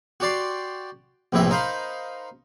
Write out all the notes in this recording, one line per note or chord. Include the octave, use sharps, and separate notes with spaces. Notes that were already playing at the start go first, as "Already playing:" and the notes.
F#4 G4 D5 C6
A#1 A2 C3 E3 E5
D#4 A#4 C5 F5 B5